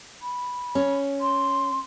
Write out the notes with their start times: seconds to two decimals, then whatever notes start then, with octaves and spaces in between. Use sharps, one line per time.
0.21 B5
0.75 C#4
1.21 C6